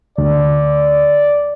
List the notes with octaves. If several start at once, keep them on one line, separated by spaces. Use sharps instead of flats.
D2 D5